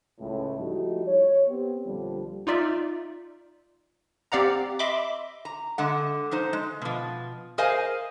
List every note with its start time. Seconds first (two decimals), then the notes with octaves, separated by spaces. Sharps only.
0.19 C#2 A2
0.58 F3 G3 A3 D#4 E4 F#4
1.06 C#5
1.48 B3 C4 G4
1.85 A#1 D3 F3 G3
2.47 D#4 F4 D5 E5
4.32 C4 G4 D5 F5 F#5 A#5
4.79 D#5 E5 B5 C6 D6
5.45 A#5
5.78 D3 G#3 F#5
6.31 F3 D#4 C5
6.53 G#3
6.82 B2 F3
7.58 G#4 A#4 C5 D#5 F5 G#5